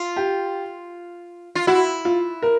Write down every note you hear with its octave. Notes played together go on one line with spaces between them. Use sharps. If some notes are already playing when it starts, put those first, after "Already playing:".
Already playing: F4
G4
F4
E4 F#4
F4
A#4